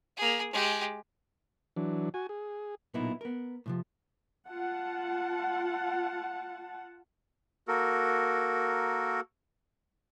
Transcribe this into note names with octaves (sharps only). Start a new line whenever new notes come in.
A#3 G#4
G#3 G4
E3 F#3 D4
F#4 G#5
G#4
B1 A#2 A#3 B3 D#4 E4
B3 A#4
A2 C3 F3
F4 F#5 A5
A#3 F#4 A4 A#4